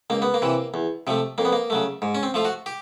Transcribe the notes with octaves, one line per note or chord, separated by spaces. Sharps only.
C#2 A#3
B3
A#3
C3 E3
E2
C3 F3 A3
F2 A#3
B3
A#3
C#3 F#3 A3
G#2
C#4
C4
F3 A3 F4
F#4
G4